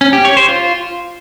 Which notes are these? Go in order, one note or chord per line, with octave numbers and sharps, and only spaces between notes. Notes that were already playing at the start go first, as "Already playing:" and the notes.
C#4
G4
C#5
C5
F4